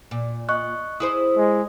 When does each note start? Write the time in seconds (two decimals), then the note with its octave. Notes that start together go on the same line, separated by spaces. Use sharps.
0.11 A#2
0.49 D#5 C#6 F#6
1.00 E4 G#4 C5 D#6
1.37 G#3